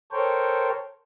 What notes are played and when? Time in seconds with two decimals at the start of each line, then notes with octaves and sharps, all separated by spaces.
0.12 A4 A#4 C5 C#5 G5